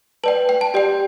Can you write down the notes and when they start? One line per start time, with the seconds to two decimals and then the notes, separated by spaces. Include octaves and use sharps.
0.24 B4 D5 G5 A5
0.49 G5
0.61 A5
0.74 G4 D5 G5